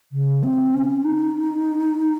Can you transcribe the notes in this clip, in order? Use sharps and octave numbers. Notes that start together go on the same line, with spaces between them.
C#3
C4
C#4
D#4